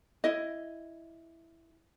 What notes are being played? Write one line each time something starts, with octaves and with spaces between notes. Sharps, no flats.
E4 D#5